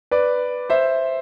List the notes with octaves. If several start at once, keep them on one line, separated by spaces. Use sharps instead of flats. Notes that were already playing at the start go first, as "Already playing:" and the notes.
B4 D5
C5 E5